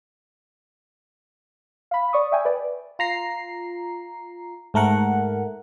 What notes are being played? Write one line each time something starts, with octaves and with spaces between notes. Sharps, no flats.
F5 B5
D5 C#6 D#6
E5 G5 G#5
B4 D5
F4 A#5 C7
G#2 A3 A#4 F#5